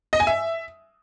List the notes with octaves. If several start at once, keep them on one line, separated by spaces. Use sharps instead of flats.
D#5
G#5
E5